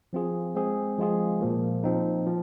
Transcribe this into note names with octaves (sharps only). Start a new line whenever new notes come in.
F3 C4 F4 G#4
G#3 C4 G#4
F3 G#3 F4 G#4
A#2 F3 A#3
F3 C4 D#4
F3